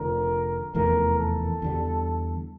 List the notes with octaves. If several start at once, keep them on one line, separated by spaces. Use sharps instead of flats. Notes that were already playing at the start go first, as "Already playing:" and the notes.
Already playing: F1 D3 F3 A#4
F1 E2 E3 A3 A#4
A4
E2 D3 G3